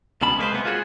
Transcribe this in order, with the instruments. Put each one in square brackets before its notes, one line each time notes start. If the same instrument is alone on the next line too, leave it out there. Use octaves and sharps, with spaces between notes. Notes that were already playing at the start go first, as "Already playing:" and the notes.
[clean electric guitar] C#2 B2 C#4 A5 B5
G#3 A#3 B3 B4 C5
C3 G#3 A#3 B3
F4 F#4 G#4 C5 C#5